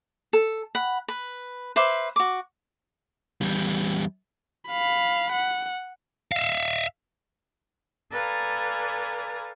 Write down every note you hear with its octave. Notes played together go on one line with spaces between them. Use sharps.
A4
F#5 B5
B4
B4 C5 E5 D6
F#4 D6
E2 G3
F5 B5
F#5
E5 F5
A4 B4 D5 F5 G#5 A#5